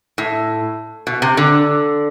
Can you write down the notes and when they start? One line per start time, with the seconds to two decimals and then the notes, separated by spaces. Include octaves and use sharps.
0.18 A2
1.07 B2
1.22 C3
1.37 D3